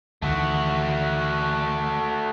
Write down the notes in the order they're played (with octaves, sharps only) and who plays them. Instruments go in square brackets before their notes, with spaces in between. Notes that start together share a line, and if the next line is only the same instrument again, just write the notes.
[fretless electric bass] D2 D#3 E3 [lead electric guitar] A3 F#4